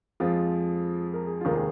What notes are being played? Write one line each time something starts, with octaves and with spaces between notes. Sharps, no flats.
F2 F3 G#3 F4
A#4
G#4
F1 D#2 D#3 G#3 F4
G#4